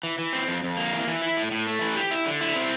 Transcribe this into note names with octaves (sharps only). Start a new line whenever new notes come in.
E3
E3
C4
F2
F2
A#3
E3
E3
E4
A2
A2
A3
E3
G4
E4
D3
E4
C4